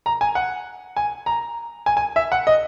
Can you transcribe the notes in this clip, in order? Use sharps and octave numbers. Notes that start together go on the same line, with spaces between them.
A#5
G#5
F#5
G#5
A#5
G#5
G#5
E5
F#5
D#5